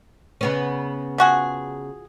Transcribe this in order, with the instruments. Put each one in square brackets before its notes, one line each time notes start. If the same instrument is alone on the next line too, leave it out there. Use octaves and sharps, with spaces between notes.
[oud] C#3 B3 C#4
[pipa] F3 F#4 G#4